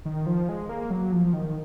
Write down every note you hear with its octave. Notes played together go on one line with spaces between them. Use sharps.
D#3
F3
G#3
A#3
F#3
F3
D#3